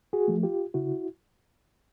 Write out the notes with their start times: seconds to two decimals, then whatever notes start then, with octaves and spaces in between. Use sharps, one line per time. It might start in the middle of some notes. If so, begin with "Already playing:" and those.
0.13 F#4 G#4
0.28 F3 A3
0.43 F4 G4
0.74 C#3 E4 F#4